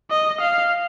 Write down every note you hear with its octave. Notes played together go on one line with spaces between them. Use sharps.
D#5
F5